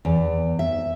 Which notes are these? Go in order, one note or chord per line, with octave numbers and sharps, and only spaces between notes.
E2
E5